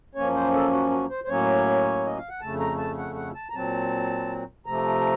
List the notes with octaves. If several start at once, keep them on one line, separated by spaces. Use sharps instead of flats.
F#2 F3 A#3 C#4 C#5
C5
A4
F#4
F#4
C5
C5
A2 F#3 A#3 C#4 C#5
D#5
F5
F#5
F2 C#3 A3 A5
A#5
A5
F#5
F#5
A5
A#5
A#2 F#3 C4 A5
C3 F3 A3 A#5